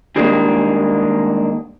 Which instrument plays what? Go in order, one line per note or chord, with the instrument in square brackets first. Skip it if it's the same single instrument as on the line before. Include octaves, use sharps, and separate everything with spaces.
[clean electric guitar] D#3 G3 G#3 A#3 D4